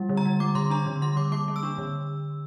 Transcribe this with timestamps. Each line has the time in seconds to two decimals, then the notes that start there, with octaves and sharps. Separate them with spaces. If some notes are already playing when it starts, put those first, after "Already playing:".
Already playing: G3
0.09 D3
0.17 A#5
0.25 G3
0.40 G3 D6
0.55 D3 C6
0.70 D4 A#5
0.86 D3
1.01 G3 C6
1.16 D3 D6
1.32 A#3 D6
1.48 A#3
1.56 E6
1.63 D4
1.78 D3